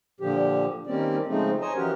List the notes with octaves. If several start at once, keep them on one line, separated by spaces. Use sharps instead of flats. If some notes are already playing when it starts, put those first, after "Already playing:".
A#2 D3 F3 G4
D#3 G3 A#3 C4 C#4 D5
C#3 F3 G#3 A3 C4 D#4
C5 C#5 D#5 G#5 A#5
E3 F3 C#4 F#4 G4 A#4